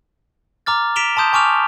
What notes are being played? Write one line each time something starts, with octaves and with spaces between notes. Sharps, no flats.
A#5 D6 F6 A6
B6 D7 E7 F7 G7
A5 C6 D#6 G6
G#5 C#6 D6 F6 F7